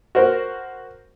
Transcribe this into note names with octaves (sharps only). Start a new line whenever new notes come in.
F#4 A#4 C5